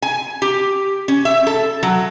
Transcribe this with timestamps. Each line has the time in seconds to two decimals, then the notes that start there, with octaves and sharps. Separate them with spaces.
0.02 G#5
0.42 G4
1.08 C#4
1.25 E5
1.47 A4
1.83 F#3